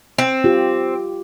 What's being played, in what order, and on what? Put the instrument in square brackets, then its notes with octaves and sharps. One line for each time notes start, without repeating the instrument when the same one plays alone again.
[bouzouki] C4
[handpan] F4 G4